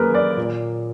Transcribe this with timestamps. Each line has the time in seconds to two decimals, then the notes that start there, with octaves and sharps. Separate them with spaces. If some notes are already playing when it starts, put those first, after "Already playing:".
Already playing: F#2 A#3 G#4 A#4 B4
0.14 D5
0.37 A#2